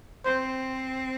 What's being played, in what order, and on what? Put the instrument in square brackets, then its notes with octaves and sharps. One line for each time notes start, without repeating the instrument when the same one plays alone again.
[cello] C4 [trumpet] C5